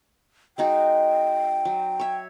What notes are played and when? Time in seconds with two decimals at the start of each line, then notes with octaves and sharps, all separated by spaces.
0.58 G#3 D#4 F#4 G5
1.65 F#3
1.99 C#5 E5